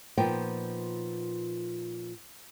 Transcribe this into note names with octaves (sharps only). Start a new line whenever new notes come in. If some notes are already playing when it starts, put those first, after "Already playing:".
A#2 F3 B3 D#4 G5